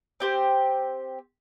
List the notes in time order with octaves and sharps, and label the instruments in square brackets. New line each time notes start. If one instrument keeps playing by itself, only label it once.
[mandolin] C4 G4 C5